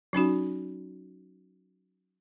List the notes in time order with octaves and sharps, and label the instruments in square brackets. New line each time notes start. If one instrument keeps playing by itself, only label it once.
[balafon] F#3 C#4 D#4 F#4